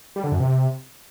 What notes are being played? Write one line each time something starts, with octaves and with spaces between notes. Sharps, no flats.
G3
D3
F#2
C3